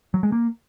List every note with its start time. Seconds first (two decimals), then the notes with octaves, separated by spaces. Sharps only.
0.14 F#3
0.23 G#3
0.32 A#3